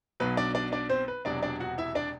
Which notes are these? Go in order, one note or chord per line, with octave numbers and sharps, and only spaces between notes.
B1 B2 F#3 B4
D4 D5
D4 D5
D4 D5
C4 C5
B4
E1 E2 C3 F#3 D4 D5
D4 D5
F#4 F#5
E4 E5
D4 D5